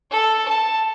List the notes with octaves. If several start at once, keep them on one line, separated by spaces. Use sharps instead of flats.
A4
A5